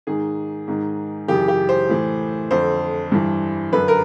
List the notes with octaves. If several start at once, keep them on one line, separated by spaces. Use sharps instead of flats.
G#2 D#3 G#4
G#2 D#3
F#2 C#3 E3 G4
G4
C5
A2 E3
F2 D3 C5
G2 E3
F#2 D3 B4
A#4